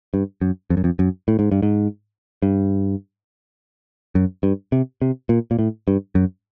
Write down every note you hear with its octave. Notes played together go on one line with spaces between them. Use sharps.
G2
F#2
F2
F#2
F2
F#2
A2
G#2
G2
G#2
G2
F#2
G2
C3
C3
A#2
A#2
A2
G2
F#2